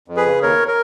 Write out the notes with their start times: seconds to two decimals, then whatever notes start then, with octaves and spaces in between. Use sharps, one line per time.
0.08 F2
0.17 G#4 B4
0.26 C#3
0.42 D#2 A#4 C#5
0.68 A#4